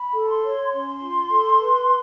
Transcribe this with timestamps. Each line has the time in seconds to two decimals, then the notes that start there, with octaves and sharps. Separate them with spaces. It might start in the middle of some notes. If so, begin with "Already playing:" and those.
Already playing: B5
0.13 A4
0.28 C6
0.43 C#5
0.71 C#4 C6
1.02 F4
1.30 A4
1.59 B4